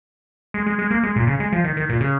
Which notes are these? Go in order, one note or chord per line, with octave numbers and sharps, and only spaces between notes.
G#3
G#3
G#3
A#3
G#3
A#2
C#3
G#3
F3
D#3
D#3
A#2
C#3